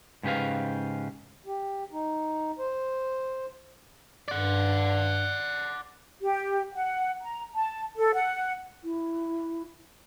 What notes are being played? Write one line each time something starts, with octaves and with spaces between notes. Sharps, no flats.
G#2 C#3 G4 B4 F5
G4
D#4
C5
G2 D5 F#5
G4
F#5
A#5
A5
A4
F#5
E4